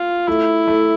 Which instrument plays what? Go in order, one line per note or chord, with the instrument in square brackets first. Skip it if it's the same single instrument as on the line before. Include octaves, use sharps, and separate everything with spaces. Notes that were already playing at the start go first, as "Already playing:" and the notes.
Already playing: [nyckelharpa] F4
[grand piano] A3 [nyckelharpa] E4
[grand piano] A3